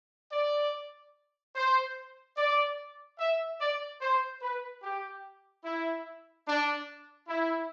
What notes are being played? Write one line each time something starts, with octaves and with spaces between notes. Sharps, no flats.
D5
C5
D5
E5
D5
C5
B4
G4
E4
D4
E4